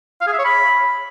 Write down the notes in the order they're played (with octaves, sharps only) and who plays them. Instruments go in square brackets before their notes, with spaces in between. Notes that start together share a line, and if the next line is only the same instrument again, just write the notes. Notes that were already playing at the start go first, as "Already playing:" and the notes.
[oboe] F5
G#4
E5
C#5
B5